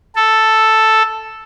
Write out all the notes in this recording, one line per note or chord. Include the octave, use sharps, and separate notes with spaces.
A4